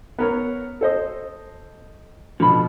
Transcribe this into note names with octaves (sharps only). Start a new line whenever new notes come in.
B3 A#4 C#5
A4 C5 D#5
B2 D3 F3 B5